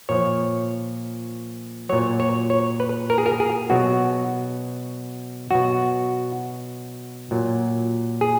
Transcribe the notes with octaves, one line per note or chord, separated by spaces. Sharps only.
A#2 F3 C#5
A#2 F#3 C#5
C#5
C#5
B4
A#4
G#4
A#4
G#4
B2 F#3 F#4
B2 F#3 F#4
A#2 F#3
G#4